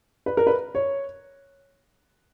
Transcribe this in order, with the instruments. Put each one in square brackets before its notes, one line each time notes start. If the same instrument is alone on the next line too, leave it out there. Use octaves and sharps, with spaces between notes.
[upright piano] B4
A#4
B4
C#5